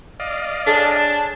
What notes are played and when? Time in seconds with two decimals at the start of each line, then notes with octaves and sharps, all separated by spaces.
0.20 D5 D#5 F5
0.67 D4 G#4 A4 C#5 A5